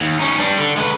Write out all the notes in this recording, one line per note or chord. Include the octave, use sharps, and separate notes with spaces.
D#2
C#4 D#4
G3 D4
D3
G#3 B4